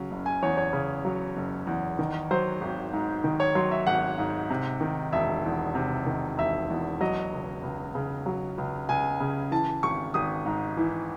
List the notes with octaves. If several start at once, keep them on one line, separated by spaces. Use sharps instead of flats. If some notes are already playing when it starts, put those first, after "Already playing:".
Already playing: C#3 F#3
F#1
G#5
E2 C#5
C#5
C#3
F#3
F#1
E2
D#3
F#3 C5
G#1
G#2
D#3
C#5
F#3 C6
E5
G#1 F#5
G#2
C3
D#3
E1 E5
E2
C3
D#3
E1 E5
E2
F#3 D#5
C#2
C#2
C#3
F#3
C#2
C#2 G#5
C#3
E3 A5
G#1 C#6
G#1 D#6
G#2
E3